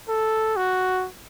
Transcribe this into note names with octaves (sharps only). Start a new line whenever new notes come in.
A4
F#4